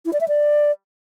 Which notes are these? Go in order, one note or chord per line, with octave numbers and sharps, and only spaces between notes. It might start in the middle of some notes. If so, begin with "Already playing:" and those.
E4
D5
E5
D5